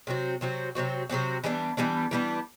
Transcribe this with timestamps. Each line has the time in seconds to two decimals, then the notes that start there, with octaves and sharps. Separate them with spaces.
0.07 C3 F#3 C4 F#4
0.41 C3 F#3 C4 F#4
0.75 C3 F#3 C4 F#4
1.10 C3 F#3 C4 F#4
1.44 E3 G3 B3 D4
1.77 E3 G3 B3 D4
2.11 E3 G3 B3 D4